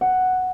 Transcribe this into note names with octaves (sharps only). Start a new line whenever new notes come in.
F#5